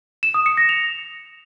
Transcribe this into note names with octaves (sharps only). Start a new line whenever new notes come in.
E7
D#6
C#7
A#6
F7